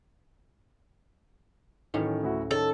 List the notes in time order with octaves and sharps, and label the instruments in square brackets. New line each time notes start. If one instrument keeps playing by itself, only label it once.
[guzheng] A2 F#3 C#4 [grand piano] D#3 E3
[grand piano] D2 E4 F#4
[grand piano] D#3 C#4 [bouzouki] A4